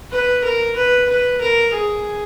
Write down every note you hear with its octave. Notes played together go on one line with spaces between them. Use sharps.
B4
A#4
B4
B4
A#4
G#4